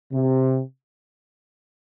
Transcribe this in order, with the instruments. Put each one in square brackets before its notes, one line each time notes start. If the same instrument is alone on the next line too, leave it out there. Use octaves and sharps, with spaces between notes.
[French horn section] C3